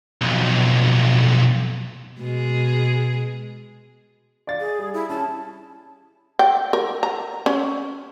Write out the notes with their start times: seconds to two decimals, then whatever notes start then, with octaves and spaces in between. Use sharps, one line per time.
0.21 B1 F2
2.19 B2 G#3 G#4
4.47 D5 F5 A6
4.60 G#4
4.79 G3
4.94 E4
5.10 C#4 A5
6.39 G5
6.73 A#4
7.03 A#5
7.46 C#4